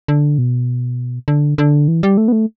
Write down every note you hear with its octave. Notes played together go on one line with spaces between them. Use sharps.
D3
B2
D3
D3
E3
G3
A3
B3
A3